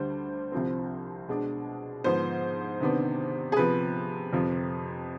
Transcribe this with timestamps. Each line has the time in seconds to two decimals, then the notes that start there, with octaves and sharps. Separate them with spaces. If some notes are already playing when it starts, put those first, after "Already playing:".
Already playing: D2 D3 G3 D4 C5
0.52 C2 C3 F3 C4
1.28 B2 G#3 D4
2.04 G#2 F3 B3 C5
2.80 C3 D#3 B3 D4
3.52 G#4
3.56 C3 F3 B3 B4
4.33 F2 C3 F3